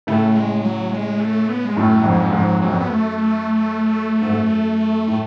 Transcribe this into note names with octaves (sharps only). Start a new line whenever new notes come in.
A2 C#3 A3
G#3
F#3
G#3
A3
B3
G#3
F#2 A2 A3
F#3
F2 G#2
F#3
F3
F#2
F2 G#2
F#3
F#2 F#3
F2
F#2 B3
A3
A3
G#2
F#2
A2